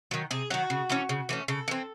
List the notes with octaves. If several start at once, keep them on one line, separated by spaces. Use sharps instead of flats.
D#3 F#3
C3 G#4
D#3 F#3 F#4
C#3
E3 A3 C#4
C#3
E3 A3 C#4
C#3 A4
E3 C4